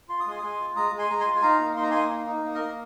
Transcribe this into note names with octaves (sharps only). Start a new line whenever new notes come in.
F4 C6
D#6
G#3 G#5 C6
D#6
G#3 G#5 C6
F4
G#3 A#5 D#6
G#3
G#5 C6
G#3 A#5
G#5 C6
F4
G#5
D#4 F5 A#5
A#3
D#4 C6
A#5
A#3 G#5 C6
D#4
D#4
A#3
A#4 D#5
A#3